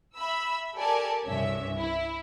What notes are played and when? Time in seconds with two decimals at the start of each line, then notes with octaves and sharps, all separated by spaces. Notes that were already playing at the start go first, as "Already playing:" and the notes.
0.16 E5 B5 E6
0.76 G4 A4 A#4 D5 G#5 A5
1.25 C2 G2 C#3 C#4 E5
1.79 E4